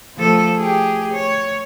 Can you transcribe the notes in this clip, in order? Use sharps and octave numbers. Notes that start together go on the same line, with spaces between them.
F3 A3 A4
G4 G#4
C#5